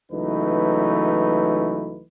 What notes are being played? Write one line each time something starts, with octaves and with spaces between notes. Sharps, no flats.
C#2 E3 F#3 A3 D#4 B4